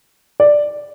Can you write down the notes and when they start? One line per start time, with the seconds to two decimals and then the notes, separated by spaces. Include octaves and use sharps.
0.40 D5